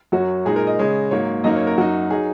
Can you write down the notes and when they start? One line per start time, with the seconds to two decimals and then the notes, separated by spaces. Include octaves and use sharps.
0.12 F#2 F#3 C#4 F#4
0.45 A#2 G#3 D#4 G#4
0.56 A#4
0.67 D#5
0.79 C#3 G#3 C#4
1.11 G#2 F#3 A#3 C#5
1.44 F#2 F#3 A#3 D#4 D#5
1.56 C#5
1.67 A#4
1.78 F#2 F#3 D#4 F#4
2.10 F#3 D#4 G#4